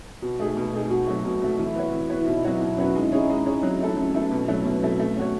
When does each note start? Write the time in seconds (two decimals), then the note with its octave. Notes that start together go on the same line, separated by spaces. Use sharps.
0.22 B2 F#4
0.40 A3 D#4 G#4
0.57 B2
0.74 A3 D#4 G#4
0.90 B2 F#4
1.07 F#3 A3
1.25 B2
1.42 F#3 A3
1.59 E3 E4
1.76 B3 F#4 C#5
1.93 E3
2.10 B3 F#4 C#5
2.21 E4
2.27 B2 D#4
2.44 F#3 B3 E4 F#4 C#5
2.61 B2 E4
2.77 F#3 B3 C#4 F#4 C#5
2.95 G#3 D#4
3.03 E4
3.12 C#4 D#4 G#4 C#5
3.30 G#3
3.46 C#4 G#4 C#5
3.63 F#3
3.81 A3 E4 A4
3.97 F#3 C#4
4.14 A3 B3 E4 A4
4.32 B2
4.48 F#3 A3 E4
4.65 B2 B3
4.82 F#3 A3 E4
5.00 A3
5.17 C#4 F#4 C#5